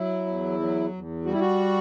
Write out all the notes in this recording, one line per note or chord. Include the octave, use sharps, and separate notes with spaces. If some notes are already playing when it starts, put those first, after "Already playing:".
Already playing: F#3 E4
E2
F#3
E2
G3 F#4
E4
F#4